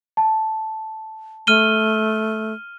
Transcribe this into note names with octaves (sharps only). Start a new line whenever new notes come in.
A5
A3 F6 D#7 G7